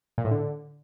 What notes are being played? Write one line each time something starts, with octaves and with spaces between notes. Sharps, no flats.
A#2
A2
D3